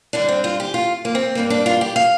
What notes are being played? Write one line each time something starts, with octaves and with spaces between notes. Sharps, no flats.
G2 D3 G3 D4
C4
F4
G4
F4
A#3
C4
G2 G3 A#3
D4
F4
G4
F5